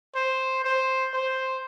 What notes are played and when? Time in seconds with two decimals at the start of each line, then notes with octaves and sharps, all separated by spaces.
0.15 C5
0.64 C5
1.13 C5